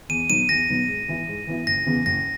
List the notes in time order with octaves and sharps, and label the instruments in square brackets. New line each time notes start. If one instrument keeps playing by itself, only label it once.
[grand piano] E2 [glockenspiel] D#7
[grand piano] B2 F#3 B3 D#4 [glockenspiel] D#7
[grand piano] E2 [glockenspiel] A#6
[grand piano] B2 F#3 B3 D#4
G#2
E3 B3 E4
G#2
E3 B3 E4
[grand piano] F#1 [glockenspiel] A#6
[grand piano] E2 C#3 E3 B3
[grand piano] F#1 [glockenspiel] A#6